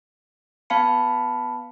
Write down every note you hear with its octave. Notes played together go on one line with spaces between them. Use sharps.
B3 F5 A5 B5 C#7